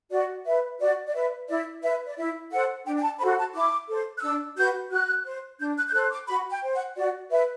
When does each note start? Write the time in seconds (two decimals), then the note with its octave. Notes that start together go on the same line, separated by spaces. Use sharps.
0.11 F#4 D5
0.46 B4 E5
0.80 F#4 D5
1.07 D5
1.14 B4 E5
1.48 E4 D5
1.83 B4 E5
2.06 D5
2.17 E4 E5
2.52 A4 C5 F#5
2.86 D4 G5
2.98 G5
3.03 A5
3.20 F#4 A4 C5 B5
3.38 A5
3.54 E4 D6
3.88 A4 C5
4.18 F#6
4.22 D4 E6
4.57 F#4 B4 G6
4.91 F#4 F#6
5.26 C5
5.60 D4 G6
5.77 F#6
5.88 G6
5.93 A4 C5 F#6
6.11 D6
6.28 F#4 B5
6.51 G5
6.63 C5
6.75 F#5
6.96 F#4 D5
7.31 B4 E5